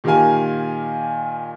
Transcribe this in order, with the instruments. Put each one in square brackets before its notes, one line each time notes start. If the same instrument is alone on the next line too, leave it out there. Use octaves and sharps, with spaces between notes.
[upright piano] A#2 D#3 G4 A#4 F5 G#5